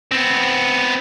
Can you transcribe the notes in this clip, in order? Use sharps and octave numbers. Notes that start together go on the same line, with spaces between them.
B3 C4